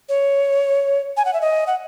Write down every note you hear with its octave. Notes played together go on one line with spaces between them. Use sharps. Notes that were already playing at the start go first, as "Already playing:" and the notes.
C#5
G#5
F#5
E5
D#5
F#5